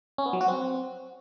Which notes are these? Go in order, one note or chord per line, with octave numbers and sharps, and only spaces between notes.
C#4
B3
F#3
F#4
C4